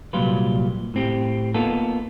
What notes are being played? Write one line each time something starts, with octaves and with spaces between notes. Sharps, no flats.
C2 A#2 F#3 G3 F4 B4
A2 C4 G4
A#3 B3 D#4 F4 A4